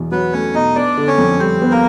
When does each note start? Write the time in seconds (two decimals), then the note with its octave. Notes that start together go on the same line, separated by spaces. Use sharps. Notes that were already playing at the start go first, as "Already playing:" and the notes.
Already playing: E2 B2
0.12 F#3 B3 B4
0.33 A3 C#4 C#5
0.54 B2 D#4 D#5
0.75 B3 D4 D5
0.97 D3
1.07 C#4 C#5
1.18 F2
1.39 G3 C4 C5
1.62 B3
1.71 A#3 A#4